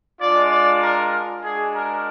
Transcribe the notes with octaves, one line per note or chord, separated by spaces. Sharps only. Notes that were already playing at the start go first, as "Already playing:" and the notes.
G#3 D4 F4 D5
D5
A#4
G#3 D4 F#4 G#4
A#4